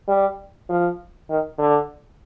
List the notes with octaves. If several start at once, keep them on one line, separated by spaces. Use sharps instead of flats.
G3
F3
D#3
D3